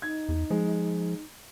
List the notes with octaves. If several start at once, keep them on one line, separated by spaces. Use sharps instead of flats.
D#4 G#6
E2
F3 G#3